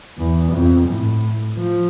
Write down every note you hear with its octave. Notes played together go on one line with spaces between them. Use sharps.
E2
F2
A2
F3